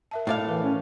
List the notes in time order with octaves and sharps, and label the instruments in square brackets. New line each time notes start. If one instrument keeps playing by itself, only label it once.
[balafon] A#4 E5 A5
[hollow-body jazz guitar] A2 D5 F5
[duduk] E3 [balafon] A#4
[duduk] C#4